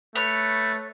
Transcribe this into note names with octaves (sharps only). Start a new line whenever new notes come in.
A3 B4 C#5